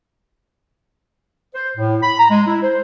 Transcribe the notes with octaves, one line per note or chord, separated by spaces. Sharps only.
C5
A2
B5
A#5
G#3
E4
C5